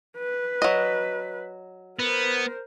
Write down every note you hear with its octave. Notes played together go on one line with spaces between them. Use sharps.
B4
F#3 D#5
B3 A#4 C5